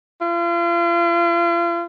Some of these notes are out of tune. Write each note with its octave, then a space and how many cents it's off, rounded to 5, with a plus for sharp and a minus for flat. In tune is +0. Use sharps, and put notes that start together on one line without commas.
F4 -40